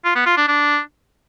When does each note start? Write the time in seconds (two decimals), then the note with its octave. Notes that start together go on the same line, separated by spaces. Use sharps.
0.05 F4
0.15 B3
0.26 F4
0.37 D4
0.47 D4